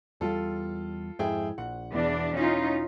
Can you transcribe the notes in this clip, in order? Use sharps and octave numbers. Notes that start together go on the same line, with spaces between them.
E2 G3 F4 A4
F2 G#2 E4 G#4 G5
A#1 F#5
E1 E2 D4
E3 C#4 D#4 F4